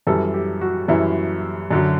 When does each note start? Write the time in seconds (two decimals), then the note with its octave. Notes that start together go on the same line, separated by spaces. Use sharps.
0.07 F#2 E3 G3 A4
0.34 G4
0.61 F#4
0.88 F#2 E3 G3 E4
1.71 F#2 D3 F#3